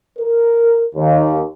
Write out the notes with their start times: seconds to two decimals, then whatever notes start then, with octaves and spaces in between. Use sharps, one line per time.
0.19 A#4
0.96 D#2